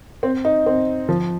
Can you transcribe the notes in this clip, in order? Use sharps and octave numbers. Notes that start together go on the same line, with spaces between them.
C4
D#4
C4
F3